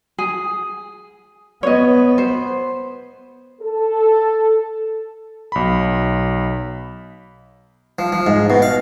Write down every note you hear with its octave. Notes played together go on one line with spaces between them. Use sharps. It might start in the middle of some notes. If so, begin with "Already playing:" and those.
G#4
B3 C#5 D#5
C5
A4
B1 B5
F3
F3
G#2
B2
F5